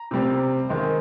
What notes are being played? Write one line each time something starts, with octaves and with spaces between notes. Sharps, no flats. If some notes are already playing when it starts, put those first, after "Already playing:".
Already playing: A#5
C3 G3 C4
D#3 G#3 C4